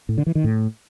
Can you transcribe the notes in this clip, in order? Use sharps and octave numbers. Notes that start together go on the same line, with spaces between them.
A2
D3
E3
D#3
A2